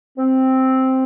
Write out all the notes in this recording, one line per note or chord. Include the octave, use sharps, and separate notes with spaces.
C4